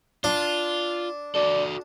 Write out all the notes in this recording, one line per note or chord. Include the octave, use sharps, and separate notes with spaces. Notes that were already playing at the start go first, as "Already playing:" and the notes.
D4 F4
F#4 A4 D5